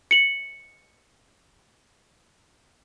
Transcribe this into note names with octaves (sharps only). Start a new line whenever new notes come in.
C#7 F#7